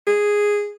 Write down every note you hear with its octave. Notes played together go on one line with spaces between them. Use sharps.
G#4